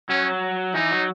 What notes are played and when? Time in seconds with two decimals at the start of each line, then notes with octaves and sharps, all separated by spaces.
0.09 F#3 C#4
0.74 E3 D#4
0.91 F#3